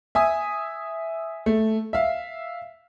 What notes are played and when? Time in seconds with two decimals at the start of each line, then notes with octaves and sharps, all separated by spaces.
0.15 E5 G#5 D#6
1.46 A3
1.93 E5 F5